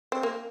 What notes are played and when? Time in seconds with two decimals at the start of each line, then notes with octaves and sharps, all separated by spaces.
0.12 C4
0.23 A#3